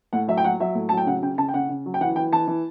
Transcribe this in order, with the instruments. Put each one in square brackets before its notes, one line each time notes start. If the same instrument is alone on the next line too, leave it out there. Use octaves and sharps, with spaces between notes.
[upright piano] A2 F#5
F#3 E5
G5
F#3 F#5
F#3 E5
A2
F#3 A5
G5
C#3 F#5
C#3 G5
C#3 A5
G5
C#3 F#5
C#3
F#3
G5
E3 F#5
E3 G5
E3 A5
E3